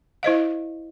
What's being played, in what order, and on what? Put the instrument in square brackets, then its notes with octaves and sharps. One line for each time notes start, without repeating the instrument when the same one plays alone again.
[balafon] E4 C5 D#5 F5